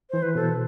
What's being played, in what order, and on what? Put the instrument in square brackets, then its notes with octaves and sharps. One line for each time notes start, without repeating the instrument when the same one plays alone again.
[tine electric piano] E3 [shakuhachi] C5
[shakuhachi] B4
[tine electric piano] B2 [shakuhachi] A4